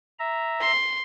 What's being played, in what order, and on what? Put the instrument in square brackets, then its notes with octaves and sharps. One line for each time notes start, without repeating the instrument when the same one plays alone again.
[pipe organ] E5 A#5
[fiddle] C6